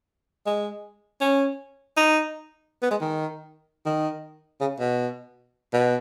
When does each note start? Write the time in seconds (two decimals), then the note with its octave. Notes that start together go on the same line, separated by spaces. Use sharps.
0.46 G#3
1.21 C#4
1.97 D#4
2.82 B3
2.91 G#3
3.01 D#3
3.86 D#3
4.61 C#3
4.80 B2
5.73 B2